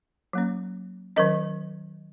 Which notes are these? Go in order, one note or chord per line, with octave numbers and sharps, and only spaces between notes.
F#3 A#3 C#4
D#3 F#3 C#4 A#4 D#5